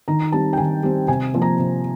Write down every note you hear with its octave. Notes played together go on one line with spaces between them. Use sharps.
D#3 A#5
G3 C4 A5
G5
D#3 G#5
G3 C4
C3 G#5
F3 A#3
A#5
C3